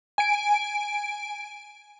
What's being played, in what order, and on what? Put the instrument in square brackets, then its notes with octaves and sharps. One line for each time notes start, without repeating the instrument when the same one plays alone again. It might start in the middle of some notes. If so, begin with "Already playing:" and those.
[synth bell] G#5 D7